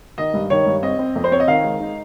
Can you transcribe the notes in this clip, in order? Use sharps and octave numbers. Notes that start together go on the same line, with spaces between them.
D#3 D#5
G2
D#3 C#5
G2
C4 D#5
C4
F2
C5
C4 C#5
D#5
D#3 F5
G#3
D#4